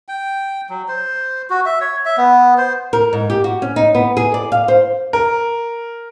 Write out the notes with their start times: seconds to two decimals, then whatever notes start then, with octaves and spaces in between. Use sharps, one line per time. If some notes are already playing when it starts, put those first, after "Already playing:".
0.08 G5
0.70 F#3
0.88 C5
1.50 F#4
1.66 E5
1.81 C#5
2.05 E5
2.18 B3
2.58 C5
2.93 A#4
3.13 G#2
3.30 G4
3.44 F#4
3.62 C#4
3.76 D#4
3.95 B3
4.17 G#4
4.34 D5
4.52 F5
4.68 C5
5.13 A#4